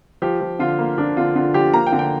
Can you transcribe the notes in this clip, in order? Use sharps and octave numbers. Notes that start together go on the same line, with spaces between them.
F3 G4
F3
D3 F4
A#3
F3 D4
D3 F4
D3 F4
F3 G4
A#3 A#5
G5
D3
G5